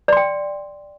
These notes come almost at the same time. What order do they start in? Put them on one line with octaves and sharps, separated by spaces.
D5 C6 G5